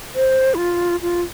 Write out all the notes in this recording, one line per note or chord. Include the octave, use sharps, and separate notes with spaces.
C5
E4
F4
F4